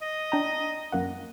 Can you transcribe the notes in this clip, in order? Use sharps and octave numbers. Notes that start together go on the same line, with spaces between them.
D#5
D4 G5 A#5
F#2 A#3 F#5